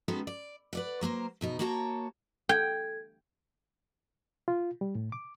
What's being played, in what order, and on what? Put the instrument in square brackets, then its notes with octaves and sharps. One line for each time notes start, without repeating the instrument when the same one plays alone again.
[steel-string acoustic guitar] D#3 G#3 B3 C#4 F#4 A4
D5
B4 D5 F#5
F#3 A#3 A#4 C5
E2 B2 D#4
A#3 F#4 C#5 A5 A#5
[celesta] A4 G#6 [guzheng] G5
[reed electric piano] F4
G3
A2
D6